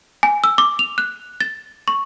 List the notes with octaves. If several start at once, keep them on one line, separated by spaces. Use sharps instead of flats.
G#5
E6
D6
F7
F#6
A6
C#6